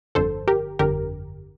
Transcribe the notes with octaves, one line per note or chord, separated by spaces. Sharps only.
G1 F2 D3 A4 C5
G4 A#4
G1 F2 D3 G4 A#4